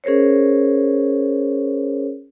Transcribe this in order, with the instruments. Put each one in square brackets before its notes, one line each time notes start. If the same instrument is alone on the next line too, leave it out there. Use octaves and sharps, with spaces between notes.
[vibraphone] C#4 G#4 A#4 C5 C#5